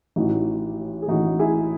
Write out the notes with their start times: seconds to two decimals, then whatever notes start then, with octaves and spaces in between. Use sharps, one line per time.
0.16 A1 A2 E3 D#4 F#4
1.02 G#4
1.08 A1 A2 E3 D#4 F#4
1.39 E4 G#4